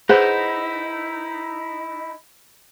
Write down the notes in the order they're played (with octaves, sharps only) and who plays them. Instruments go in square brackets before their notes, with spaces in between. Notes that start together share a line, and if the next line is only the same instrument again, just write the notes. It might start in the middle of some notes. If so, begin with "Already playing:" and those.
[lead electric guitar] D#4 E4 [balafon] G#4 [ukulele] B4 C5 F#5